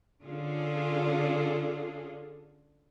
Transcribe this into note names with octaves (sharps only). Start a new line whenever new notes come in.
D3 C#4 D4 F4 G#4 A4